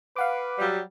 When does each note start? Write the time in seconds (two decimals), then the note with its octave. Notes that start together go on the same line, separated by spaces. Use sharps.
0.16 B4 F5 F#5 D6
0.59 F#3 G3